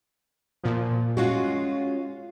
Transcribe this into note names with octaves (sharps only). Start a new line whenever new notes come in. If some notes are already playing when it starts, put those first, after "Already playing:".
A#2 F3
G#3 C#4 F4 F#4